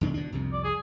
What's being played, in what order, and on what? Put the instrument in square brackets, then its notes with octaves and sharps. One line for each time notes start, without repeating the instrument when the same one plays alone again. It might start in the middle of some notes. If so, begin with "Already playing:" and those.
[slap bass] D#2 C#3 D4
B2 D4
C2 F2 C3
[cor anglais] D5
G#4